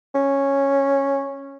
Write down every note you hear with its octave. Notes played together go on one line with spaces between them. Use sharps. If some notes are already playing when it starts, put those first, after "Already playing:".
C#4